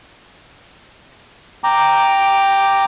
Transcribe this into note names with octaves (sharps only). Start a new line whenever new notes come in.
G5 A#5 D6